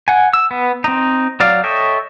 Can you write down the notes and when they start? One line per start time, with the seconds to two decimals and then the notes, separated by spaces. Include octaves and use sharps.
0.08 F#5 G#5
0.33 E6
0.51 B3
0.84 C4 D#4
1.40 F#3 D5 F5
1.64 A4 C#5 D#5 E5 G5